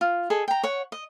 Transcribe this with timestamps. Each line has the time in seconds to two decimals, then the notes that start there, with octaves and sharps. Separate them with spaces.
0.01 F4
0.30 G#4 A4 D#5
0.48 G5 A#5
0.63 C#5 F#5
0.92 D#5